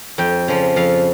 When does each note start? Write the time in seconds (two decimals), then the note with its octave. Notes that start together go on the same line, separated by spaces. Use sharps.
0.18 F2 G5
0.48 C#3 F3
0.76 F2 F5